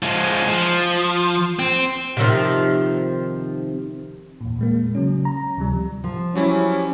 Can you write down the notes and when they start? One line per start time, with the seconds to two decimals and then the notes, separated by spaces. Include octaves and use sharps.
0.03 F3 G#3
0.48 F3
1.59 C4
2.17 C3 D#3 F3
4.41 E2 A#2
4.59 A#2 G#3 A#3
4.95 C#3 F#3 C#4
5.25 A#5
5.57 D2 C3 F3 G3
6.04 F3
6.35 F#3 G3 C#4 E4